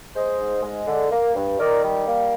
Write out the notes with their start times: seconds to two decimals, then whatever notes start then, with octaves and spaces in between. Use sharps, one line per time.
0.15 G#3 C5 D#5
0.39 G#2
0.63 G#3
0.87 D3
1.11 A#3
1.35 G2
1.59 D#3 A#4 D5
1.83 G3
2.06 A#3